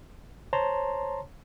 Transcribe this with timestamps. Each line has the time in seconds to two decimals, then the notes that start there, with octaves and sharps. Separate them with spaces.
0.53 C5 C#5 A5 A#5 C6